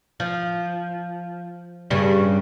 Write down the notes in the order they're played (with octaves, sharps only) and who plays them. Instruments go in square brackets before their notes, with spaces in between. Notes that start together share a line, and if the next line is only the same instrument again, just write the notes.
[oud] F3
G2 C#3 G3